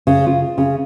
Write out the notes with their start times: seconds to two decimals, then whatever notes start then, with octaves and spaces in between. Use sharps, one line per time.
0.07 C#3
0.26 F4
0.58 C#3